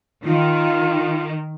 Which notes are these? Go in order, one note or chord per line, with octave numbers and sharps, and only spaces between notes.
D#3 F4